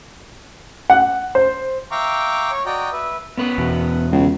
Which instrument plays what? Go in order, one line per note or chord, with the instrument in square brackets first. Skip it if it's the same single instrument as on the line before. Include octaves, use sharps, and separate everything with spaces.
[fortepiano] F#5
C5
[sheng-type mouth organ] E5 F5 G5 A#5 C#6 D6
C#5 C#6
F#4 D5 D#5 G5 A#5
B4 E5
[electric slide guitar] B3 C#4 B4
[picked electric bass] E2 B2
[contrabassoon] C#2